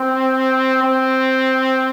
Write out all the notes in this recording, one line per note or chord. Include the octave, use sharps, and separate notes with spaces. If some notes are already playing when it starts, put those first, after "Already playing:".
Already playing: C4
C4